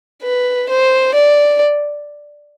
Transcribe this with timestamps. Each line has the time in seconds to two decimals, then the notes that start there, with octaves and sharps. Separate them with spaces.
0.23 B4
0.69 C5
1.14 D5